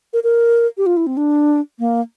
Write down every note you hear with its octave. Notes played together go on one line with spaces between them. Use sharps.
A#4
A#4
G4
F4
E4
C4
D4
A#3